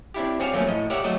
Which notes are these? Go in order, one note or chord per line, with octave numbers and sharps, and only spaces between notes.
C4 D4 E4 G4
C4 F#4 G#4 C#5 D5 F5
F3 F#3 A3 A#3 C#4
A2 D#5
G4 A#4 C#5 D5 E5 F#5
F#3 A3 F#4 D#5